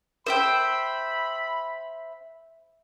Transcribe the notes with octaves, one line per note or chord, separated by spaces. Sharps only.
C5 E5 G5 B5